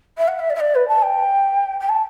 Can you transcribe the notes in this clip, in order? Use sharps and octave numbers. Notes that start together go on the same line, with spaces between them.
E5
F#5
E5
D5
E5
D5
B4
A5
G5
G5
A5